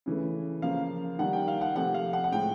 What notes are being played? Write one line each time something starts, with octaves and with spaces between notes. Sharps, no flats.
C#3 E3 A3
C#3 F3 A#3 F5
D#3 G3 A#3 F#5
G5
F5
F#5
C3 F3 A3 F#5
F5
F#5
F#5
A2 F3 G#3 G5